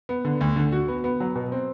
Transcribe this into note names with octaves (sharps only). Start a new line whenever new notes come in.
B3
D3
D2
D3
F#4
B3
B3
F#3
B2
C4